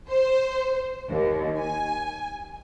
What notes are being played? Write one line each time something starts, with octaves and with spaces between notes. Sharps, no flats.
C5
D#2
G#5